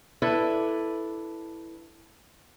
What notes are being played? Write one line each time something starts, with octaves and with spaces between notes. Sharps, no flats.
D4 E4 A4 B4